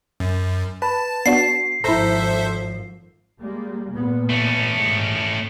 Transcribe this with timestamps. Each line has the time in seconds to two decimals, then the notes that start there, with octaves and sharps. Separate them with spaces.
0.20 F#2
0.82 B4 A5
1.26 B3 D4 F#4 C7
1.84 G#1 F3 E4 A4 C5 E5 A#5
3.40 G3 G#3 A#3
3.91 A#2 B3
4.30 A3 C#4
4.72 G#2 D#3